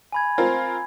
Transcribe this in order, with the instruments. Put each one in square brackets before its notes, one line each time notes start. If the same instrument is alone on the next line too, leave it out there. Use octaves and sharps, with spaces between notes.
[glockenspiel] G#5 B5 G#6
[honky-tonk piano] C4 F4 A#4